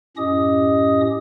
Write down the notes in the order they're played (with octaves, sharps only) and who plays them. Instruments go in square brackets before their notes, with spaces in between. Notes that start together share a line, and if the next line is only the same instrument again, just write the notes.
[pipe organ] F#2 A2 C#4 G4 D#5 D#6